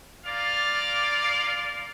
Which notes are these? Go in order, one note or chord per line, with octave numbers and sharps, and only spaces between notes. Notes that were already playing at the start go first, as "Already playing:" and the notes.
A#3 F4 D5 F5